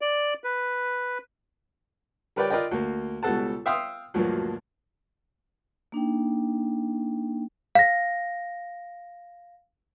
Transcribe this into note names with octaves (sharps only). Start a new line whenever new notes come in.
D5
B4
G3 A#4 B4 C#5 D5 G5
F4 A#4 B4 D5 D#5 G5
D2 A#3
C#2 B2 G3 A4 F#5 A5
E5 F5 G5 C6 D#6 F6
D2 G2 A#2 F3 F#3 A#3
A#3 D4 D#4 G5
F5 A#6